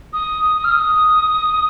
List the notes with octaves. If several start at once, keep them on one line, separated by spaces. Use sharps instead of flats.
D#6
D#6
F6
D#6